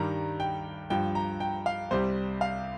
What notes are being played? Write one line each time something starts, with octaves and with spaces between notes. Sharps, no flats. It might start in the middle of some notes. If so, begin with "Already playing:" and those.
Already playing: G2 D#3 G3 A#5
G5
G2 F3 G5
A#5
G5
F5
C2 C3 G3 C5
F5